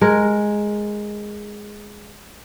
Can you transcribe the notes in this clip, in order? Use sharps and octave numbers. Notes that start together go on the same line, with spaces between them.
G#3 A#4